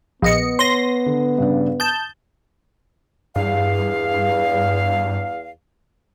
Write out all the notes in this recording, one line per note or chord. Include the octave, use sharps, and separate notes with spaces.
A#1 B3 D#5 C#7
C#5 C6 A#6 D#7
D3
G2 C#3 D4
A5 D#6 G6
E2 G2 F5